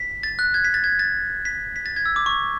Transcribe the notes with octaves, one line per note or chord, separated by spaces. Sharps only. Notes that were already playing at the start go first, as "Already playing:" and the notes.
Already playing: B6
A6
F#6
G#6
B6
A6
G#6
A6
B6
B6
A6
G#6
E6
D6
C#6